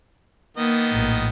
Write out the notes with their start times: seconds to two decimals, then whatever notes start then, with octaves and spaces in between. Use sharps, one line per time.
0.57 D#3 A#3 B3 D#5
0.91 A#1 A2